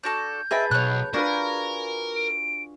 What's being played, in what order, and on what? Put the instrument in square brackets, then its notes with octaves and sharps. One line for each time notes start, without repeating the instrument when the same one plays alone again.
[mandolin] D4 F#4 A4 [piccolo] G6
[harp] G#4 B4 A5 [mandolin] D#5 E5 G5
[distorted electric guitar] B1 [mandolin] C#5 F#6
[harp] D4 F4 B4 [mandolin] F#4 G#4 [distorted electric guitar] A#4
[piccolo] D7